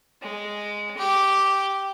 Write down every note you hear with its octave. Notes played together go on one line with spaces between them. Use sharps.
G#3
G4